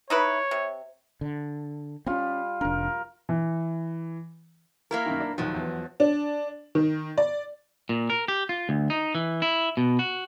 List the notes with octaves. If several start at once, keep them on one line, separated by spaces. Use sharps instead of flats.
D#4 E4 B4 C#5
C3
D3
G3 C4 C#4 F4
F1 D4 A#4
E3
A#3 E4 A#4
F#2 D#3
D4
D#2 A#2 D#3 F3 F#3
E2 B3
D4
D#3
D5
A#2
A#4
G4
F4
D2
D#4
E3
E4
B2
F#4